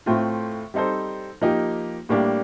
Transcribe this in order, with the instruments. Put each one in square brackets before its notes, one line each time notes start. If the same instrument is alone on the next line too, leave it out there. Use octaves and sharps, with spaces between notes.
[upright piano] A2 A3 C4 F4
G3 C4 D#4 A4 C5
F3 A#3 D#4 G4
A2 G3 A#3 D4 G4